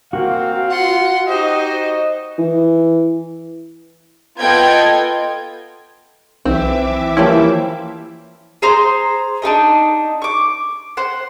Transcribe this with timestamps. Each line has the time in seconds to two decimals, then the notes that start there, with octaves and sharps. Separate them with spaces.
0.13 A#3 C4 F#4 F5
0.71 F4 F#5 C6
1.28 D#4 F#4 G4 C5 D#5
2.38 E3
4.39 B3 F4 A4 D#5 G5 G#6
6.45 B1 E3 C4 E5 D6
7.17 F3 A#3 C#4 E4 G4 C5
8.62 G#4 C5 A#5 C6
9.42 D4 D#4 G#4 D#5
10.22 C#6 D6
10.97 C5 F#5